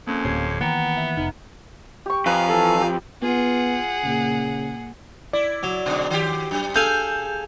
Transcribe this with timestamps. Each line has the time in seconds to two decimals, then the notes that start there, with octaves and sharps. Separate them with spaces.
0.07 F2 A#3 C#4
0.25 D1 G4 C#5 C7
0.61 D#3 E3 A#3 B3 F#5 G5 A#5
0.97 E5
1.17 F1 D#4
2.06 G4 C#6
2.26 F2 B4 D#5 F5 G#5 A#5
2.49 E3 A4 A5
2.82 G4
3.22 B3 F4 G#4 F#5
4.04 A#2 C#3
5.33 E4 D5
5.63 F#3
5.86 G#2 B2 D3
6.11 D#3 G4
6.51 F#2
6.76 G#4 A4 F5 G#5 G6